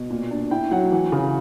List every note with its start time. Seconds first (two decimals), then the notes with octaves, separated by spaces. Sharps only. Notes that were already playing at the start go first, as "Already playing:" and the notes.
Already playing: B2
0.10 A#2
0.31 D4
0.51 E4 G5
0.71 F#3 F#5
0.92 E3 F#5
1.12 C#3